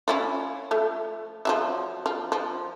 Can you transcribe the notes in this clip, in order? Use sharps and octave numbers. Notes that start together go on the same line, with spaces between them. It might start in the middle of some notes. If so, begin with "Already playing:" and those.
C#4 E4 F4
F3 A3
F3 F#3 E5
F3
F3